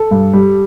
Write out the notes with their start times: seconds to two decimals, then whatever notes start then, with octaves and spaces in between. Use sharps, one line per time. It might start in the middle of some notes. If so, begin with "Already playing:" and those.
Already playing: A4
0.11 G2
0.33 G3